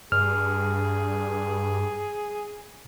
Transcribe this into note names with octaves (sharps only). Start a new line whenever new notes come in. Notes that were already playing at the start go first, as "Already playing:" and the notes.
G2 G#4 F6